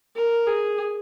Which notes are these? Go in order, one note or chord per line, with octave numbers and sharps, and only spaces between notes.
A#4
G#4